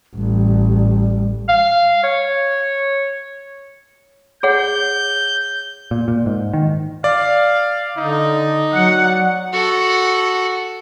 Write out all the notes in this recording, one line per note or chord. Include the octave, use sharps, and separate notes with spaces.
A1 G3
F5
C#5
G#4 C#5 F#5 G6
A#2
A#2
G#2
D#3
D5 F5
D3 D#4
F#3 F#5
F#4 A4